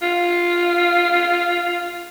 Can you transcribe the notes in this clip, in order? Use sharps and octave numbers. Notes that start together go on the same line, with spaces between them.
F4